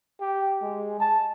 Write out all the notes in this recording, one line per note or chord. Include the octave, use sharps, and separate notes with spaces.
G4
G#3
A5